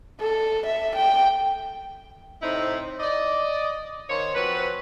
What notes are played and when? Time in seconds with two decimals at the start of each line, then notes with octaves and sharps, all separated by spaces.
0.20 A4
0.66 E5
0.96 G5
2.42 A2 C3 C4 D#4 E4
2.99 D5 D#5
4.10 D#3 A#3 C5 C#5
4.35 F3 C4 F#4 B4